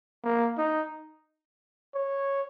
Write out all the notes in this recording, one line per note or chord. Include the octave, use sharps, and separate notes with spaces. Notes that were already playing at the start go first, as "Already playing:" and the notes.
A#3
D#4
C#5